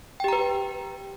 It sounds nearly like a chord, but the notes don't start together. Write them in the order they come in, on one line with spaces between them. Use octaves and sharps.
G5 G4 A#5 B4